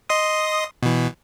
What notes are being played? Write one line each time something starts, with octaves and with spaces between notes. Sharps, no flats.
D#5 C6 D#6
B2 E3